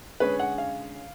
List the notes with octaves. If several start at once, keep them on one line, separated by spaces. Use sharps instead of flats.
D3 G#3 C#4 G#4 B4 C#5
F#5
F5